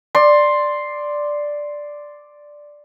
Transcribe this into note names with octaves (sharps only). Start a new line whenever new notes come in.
D5 C6